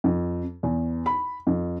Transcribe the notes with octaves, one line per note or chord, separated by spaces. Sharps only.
F2
E2
B5
F2